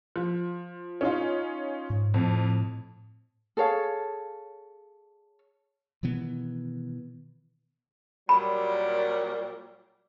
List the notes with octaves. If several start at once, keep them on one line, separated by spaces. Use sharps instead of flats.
F3
C#4 D#4 F4
G#2
F2 A2
G#4 A4 C#5 F5
B2 D#3 E3 B3
A#2 F#3 G3 B5